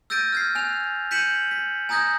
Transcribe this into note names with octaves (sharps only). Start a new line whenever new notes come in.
E6 G6 A6 A#6 D7 D#7
F6 G#6 C7
G#5 F#6 F7
G6 B6 C#7 D#7 E7 F#7
B6
G#5 A#5 D#6 G6 G#6 A#6